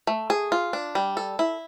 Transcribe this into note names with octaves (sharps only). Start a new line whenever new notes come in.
A3
G#4
F4
D4
G3
A4
E4